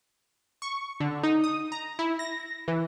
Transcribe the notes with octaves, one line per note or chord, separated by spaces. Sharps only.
C#6
D3
D#4
D#6
A#5
E4
A#6
E3